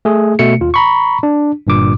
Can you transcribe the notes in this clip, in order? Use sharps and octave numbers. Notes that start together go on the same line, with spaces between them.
A3 G#4
B2 A3 C#7
D#2 F4
A#5 B5 C#6
D4
G1 G2 A#2 D6